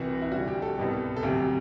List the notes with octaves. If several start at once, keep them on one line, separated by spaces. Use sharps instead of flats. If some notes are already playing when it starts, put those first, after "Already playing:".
Already playing: C2 C3 E3 F#4
E4
D2 D3 G3 F#4
G4
A4
C2 B2 G3
A4
D2 C3 F#3 G4